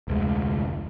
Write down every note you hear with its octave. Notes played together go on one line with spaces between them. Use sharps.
F1 D2 G#3